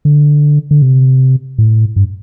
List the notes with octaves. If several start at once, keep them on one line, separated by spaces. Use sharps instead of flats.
D3
D3
C3
A2
G2